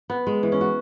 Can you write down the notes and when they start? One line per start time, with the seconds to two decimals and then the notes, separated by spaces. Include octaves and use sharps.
0.10 B3
0.27 G#3
0.43 E3
0.52 C#4
0.61 F#4